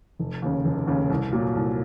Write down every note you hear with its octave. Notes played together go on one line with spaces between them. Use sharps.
F1
D#2 C#3
F1
D#2 C#3
C2
A#2 F#3
C2